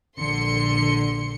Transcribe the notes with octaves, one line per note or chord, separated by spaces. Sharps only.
A#1 D3 C6 C#7